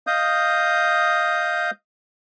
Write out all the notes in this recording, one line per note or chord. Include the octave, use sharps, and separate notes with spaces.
D#5 F5 D#6 G6